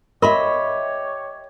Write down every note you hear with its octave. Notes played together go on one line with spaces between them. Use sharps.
G4 A#4 C#5 D#5 E5 B5 C6